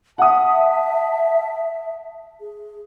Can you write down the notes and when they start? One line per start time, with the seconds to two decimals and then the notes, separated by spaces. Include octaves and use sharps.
0.18 E5 F#5 A5 D#6
2.40 G#4